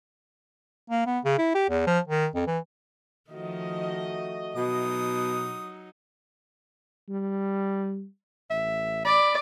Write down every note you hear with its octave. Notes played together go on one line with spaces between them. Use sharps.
A#3
B3
C#3
E4
G4
E2
F3
D#3
F2
E3
D#3 F3 A3 F#4 D#5
B2 F#3 D#4 D#6
G3
A1 E5
D5 B5